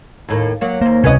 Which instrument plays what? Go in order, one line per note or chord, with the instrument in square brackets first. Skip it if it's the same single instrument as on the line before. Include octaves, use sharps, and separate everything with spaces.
[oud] D#2 A2 A#3
F#3 A#3
[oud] D#2 C5 [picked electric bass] A#3
[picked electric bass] C#2 C3 [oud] C#4 B4 D#5